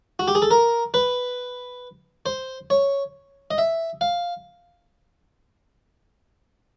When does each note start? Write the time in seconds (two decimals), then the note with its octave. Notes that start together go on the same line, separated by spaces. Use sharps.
0.19 F#4
0.28 G4
0.35 G#4
0.42 A4
0.51 A#4
0.94 B4
2.26 C5
2.70 C#5
3.51 D#5
3.58 E5
4.01 F5